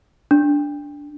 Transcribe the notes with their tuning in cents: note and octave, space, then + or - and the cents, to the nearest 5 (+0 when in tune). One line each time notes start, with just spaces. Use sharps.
D4 -10